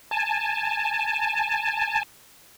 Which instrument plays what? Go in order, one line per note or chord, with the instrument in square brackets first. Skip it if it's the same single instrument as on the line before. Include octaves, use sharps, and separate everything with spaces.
[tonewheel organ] G#5 A5